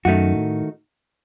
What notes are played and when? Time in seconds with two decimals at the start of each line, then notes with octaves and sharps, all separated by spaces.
0.05 F#2 D#3 A3 D#4 F#4
0.34 A2